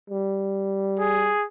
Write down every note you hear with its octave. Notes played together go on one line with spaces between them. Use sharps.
G3
G#4